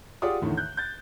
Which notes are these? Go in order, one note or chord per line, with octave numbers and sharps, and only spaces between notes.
F4 G4 G#4 D5 F#5 D#6
E2 A2 D3 D#3 A3
F#6 G6
G6 A6